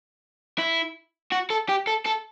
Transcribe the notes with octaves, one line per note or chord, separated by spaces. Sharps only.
E4
F#4
A4
G4
A4
A4